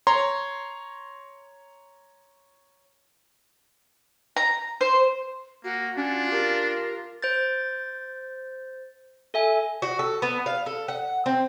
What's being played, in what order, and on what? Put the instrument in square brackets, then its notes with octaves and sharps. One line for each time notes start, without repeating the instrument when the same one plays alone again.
[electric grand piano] C#5 A#5 C6
[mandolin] A#5
C5
[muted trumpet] A#3 [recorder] F#4
[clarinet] C#4 [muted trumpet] D4 [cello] F4 [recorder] F#4
[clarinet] G4 [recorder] A#4
[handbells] C5 G6 A6
A4 E5 G#5
[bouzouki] F#4
A4
B3
F5
A4
F#5
C4